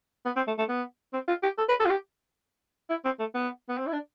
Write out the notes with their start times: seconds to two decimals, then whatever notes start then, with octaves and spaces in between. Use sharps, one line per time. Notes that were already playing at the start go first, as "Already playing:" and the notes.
0.25 B3
0.36 C4
0.47 A3
0.58 A3
0.69 B3
1.13 C4
1.28 F4
1.43 G4
1.58 A4
1.69 B4
1.80 A4
1.85 F4
1.90 G4
2.90 E4
3.05 C4
3.19 A3
3.34 B3
3.69 B3
3.78 C4
3.87 E4
3.93 D4